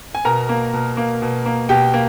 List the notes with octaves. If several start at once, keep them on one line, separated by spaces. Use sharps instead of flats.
G#5
B2 A#4 A#5
A#3
B2
A#3
B2
A#3
B2 G4 G5
A#3